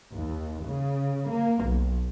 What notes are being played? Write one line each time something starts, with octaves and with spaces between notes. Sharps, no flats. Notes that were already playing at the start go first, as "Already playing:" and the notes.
D#2
C#3
A#3
B1